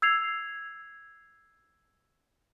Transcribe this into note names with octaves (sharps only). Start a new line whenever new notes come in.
E6 G#6 C7 F7